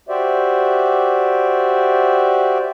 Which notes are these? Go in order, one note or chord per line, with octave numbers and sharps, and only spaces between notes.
F#4 G4 C5 D5 E5